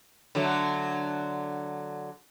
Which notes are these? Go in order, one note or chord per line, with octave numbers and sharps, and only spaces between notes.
D3 F#3 A3